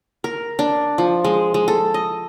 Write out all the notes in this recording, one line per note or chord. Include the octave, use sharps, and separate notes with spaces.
A#4
D4
F3
G#3
G#3
A4
D#5